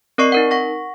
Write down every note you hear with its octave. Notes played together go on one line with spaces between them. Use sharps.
C4 A#4 D5 D#5 C#6 C7
D#4 A#4 F#5
F#5 C#6 A#6